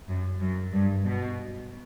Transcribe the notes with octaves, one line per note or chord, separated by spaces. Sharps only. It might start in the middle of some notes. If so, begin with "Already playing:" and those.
F#2
F#2
G2
B2